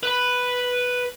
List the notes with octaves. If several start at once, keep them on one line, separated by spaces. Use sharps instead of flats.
B4 B5